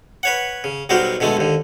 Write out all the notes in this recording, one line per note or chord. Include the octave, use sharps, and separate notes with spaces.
B4 C#5 F#5
C#3
B1 F#3 G3 F#4 A#4 C5
B2 D3 G#3 A3
D#2 D3